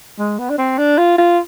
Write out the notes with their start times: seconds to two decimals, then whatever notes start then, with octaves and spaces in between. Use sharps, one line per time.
0.19 G#3
0.38 B3
0.50 D4
0.58 C4
0.78 D4
0.98 F4
1.18 F4